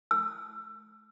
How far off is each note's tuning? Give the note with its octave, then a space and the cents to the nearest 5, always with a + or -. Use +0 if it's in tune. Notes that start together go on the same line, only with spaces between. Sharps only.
E6 +25